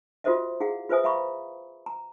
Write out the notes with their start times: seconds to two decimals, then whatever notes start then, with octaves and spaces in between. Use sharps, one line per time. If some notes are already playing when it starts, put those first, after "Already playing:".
0.24 F4 F#4 A4 C5 D#5 E5
0.60 E4 G#4 F5 F#5
0.90 F4 B4 C5 E5 G#5 D#6
1.04 E5 F5 A#5 B5 C#6
1.86 A#5